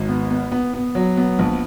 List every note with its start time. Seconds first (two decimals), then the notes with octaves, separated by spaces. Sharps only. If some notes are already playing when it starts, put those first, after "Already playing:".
Already playing: G#1
0.09 B3
0.31 B3
0.52 B3
0.74 B3
0.95 F#3
1.17 B3
1.39 A#1